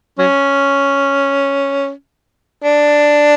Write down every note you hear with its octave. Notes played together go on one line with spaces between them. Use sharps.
F#3 C#4
D4